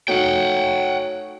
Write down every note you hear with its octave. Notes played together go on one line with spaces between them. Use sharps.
F#3 A3 D#4 F#4 F#5 G5